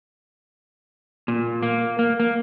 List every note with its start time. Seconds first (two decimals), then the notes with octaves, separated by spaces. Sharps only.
1.28 A#2
1.63 A#3
1.99 A#3
2.20 A#3